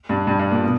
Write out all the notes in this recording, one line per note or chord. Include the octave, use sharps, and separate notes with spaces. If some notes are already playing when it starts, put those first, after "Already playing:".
G2
G2
G2
A#2
B2